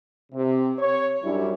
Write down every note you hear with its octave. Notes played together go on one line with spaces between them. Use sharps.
C3
C#5
F#2 G3 D4 E4